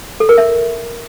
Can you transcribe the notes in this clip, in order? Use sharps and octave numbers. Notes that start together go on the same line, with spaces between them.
A4
A#4
E5